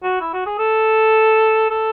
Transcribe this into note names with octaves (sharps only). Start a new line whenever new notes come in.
F#4
E4
F#4
G#4
A4
A4